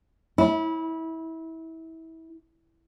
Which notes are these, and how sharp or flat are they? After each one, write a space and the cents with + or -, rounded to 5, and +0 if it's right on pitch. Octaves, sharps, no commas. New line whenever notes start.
E4 -25